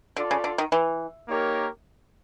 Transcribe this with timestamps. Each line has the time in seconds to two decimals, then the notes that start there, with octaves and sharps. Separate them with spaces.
0.16 D3 F4 A4 D5
0.31 C#3
0.44 D3
0.58 D#3
0.72 E3
1.28 A#3 D#4 G4 A#4 C#5